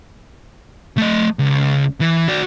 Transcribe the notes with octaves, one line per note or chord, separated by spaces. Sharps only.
A3 D#5
C#2
E3
F#4 D5